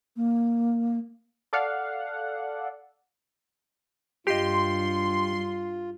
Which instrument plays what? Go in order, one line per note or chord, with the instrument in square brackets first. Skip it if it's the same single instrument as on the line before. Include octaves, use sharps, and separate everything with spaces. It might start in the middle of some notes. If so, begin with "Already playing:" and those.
[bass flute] A#3
[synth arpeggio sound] A4 D5 F5 F#5
[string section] G2 [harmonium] F4 [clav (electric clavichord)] G4 D#5 [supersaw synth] C6